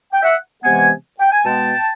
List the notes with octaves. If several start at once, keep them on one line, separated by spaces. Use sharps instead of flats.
G5
E5 F#5
C3 E3 G#3 B3 F#5 G#5
G5
G#5
B2 G#3 B3 G5 A5